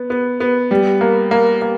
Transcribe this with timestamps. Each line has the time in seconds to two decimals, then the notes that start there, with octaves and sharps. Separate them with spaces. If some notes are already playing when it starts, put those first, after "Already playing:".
Already playing: B3
0.10 B3
0.40 B3
0.71 G3
1.01 A#3
1.31 A#3
1.62 A#3